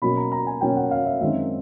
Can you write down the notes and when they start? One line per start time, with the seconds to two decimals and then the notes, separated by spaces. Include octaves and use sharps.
0.02 B2 F#3 A#3 C#4 B5
0.17 A#5
0.32 A#5
0.47 G#5
0.61 B2 F#3 A#3 C#4 G5
0.76 F#5
0.91 F5
1.06 E5
1.21 F#2 D#3 G#3 C4 D#4 E5